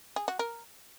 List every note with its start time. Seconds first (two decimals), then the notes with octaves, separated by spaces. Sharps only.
0.16 G#4
0.28 F#4
0.39 A#4